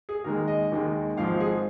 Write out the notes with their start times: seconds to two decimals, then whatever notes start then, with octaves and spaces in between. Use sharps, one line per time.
0.09 G#4
0.24 D#2 D#3 G#3 A#4
0.48 D#5
0.71 D#2 D#3 G#3
1.17 G#1 G#2 F3 F5
1.40 G#4